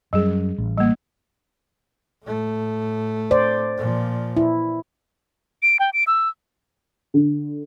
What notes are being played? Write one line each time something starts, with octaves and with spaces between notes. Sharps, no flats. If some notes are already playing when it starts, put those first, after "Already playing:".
F#2 G3 G#4
A1
G3 A#3
A2 A3
C5 D5
A#2 F3
E4
D7
G5
D7
E6
D3